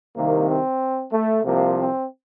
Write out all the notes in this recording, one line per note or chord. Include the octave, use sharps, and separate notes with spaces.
C2 C3 D#3 A#3
C4
A3
C2 C3 F3 A#3
C4